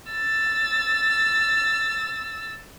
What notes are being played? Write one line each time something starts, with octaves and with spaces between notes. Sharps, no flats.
E6 A6